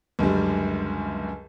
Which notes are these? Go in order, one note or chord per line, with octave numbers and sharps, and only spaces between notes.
C#2 F#2 D3 G3